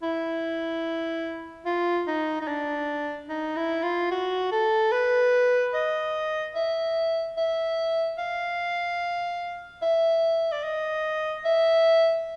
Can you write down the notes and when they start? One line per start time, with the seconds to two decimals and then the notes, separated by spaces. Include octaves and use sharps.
0.03 E4
1.66 F4
2.07 D#4
2.41 D#4
2.47 D4
3.29 D#4
3.56 E4
3.83 F4
4.11 F#4
4.52 A4
4.92 B4
5.74 D#5
6.55 E5
7.37 E5
8.18 F5
9.82 E5
10.52 D5
10.63 D#5
11.45 E5